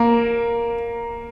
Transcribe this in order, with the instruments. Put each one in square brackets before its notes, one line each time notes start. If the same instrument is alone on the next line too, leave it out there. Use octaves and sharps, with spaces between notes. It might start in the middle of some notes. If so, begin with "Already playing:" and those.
Already playing: [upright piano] A#3 A#4